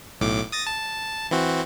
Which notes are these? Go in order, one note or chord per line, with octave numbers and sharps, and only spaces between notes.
B1 A2 D6
D#6 A6 A#6
A5
E3 C4 F#4